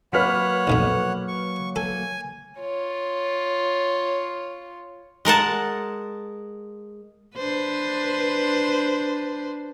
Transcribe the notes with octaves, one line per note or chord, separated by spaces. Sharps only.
F#3 A#3 B4 C#5 F#5 F6 B6
B1 F2 B2
C#6
A4 G#5
F4 C#5
G#3 A#4 F#5 A5
D4 B4 C5